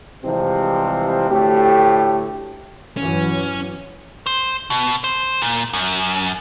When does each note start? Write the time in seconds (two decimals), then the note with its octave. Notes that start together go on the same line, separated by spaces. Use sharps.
0.24 C3 E3 F3 G3 G#3 C4
1.30 D2 A2 A3 G4
2.97 G2 E3 F#3 C#4
4.27 C5
4.70 B2
5.04 C5
5.42 A#2
5.73 F#2